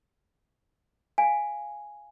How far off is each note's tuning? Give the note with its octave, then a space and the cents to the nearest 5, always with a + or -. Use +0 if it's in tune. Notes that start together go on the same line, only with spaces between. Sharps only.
F5 +0 G#5 +0